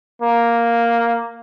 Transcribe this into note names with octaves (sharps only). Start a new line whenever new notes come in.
A#3